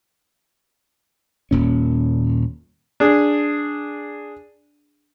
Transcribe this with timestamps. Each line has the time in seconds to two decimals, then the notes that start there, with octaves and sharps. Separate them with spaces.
1.51 D#1 A#2 C#4
3.00 D4 G#4